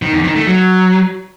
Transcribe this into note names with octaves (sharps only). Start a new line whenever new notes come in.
D#3
E2
D#3
A3
F#3